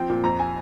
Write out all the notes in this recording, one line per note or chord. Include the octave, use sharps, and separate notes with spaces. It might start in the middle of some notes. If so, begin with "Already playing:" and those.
Already playing: F3 C4 G5
A#2
F2 A#5
G#5